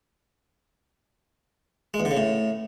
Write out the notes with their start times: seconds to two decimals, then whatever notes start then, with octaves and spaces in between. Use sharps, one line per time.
1.94 G#3
2.00 E2
2.05 D3
2.11 C#3
2.17 A2